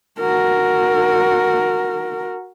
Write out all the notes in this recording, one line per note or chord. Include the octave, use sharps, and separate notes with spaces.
F#4 A#4